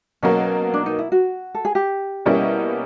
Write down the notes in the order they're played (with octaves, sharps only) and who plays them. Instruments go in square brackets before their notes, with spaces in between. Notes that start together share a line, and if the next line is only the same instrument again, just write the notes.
[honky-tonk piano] B2 F#3 A#3 [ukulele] C#4
[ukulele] D4
D#4
E4
F#4
A4
G#4
G4
[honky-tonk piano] B2 G3 A#3 C#4 E4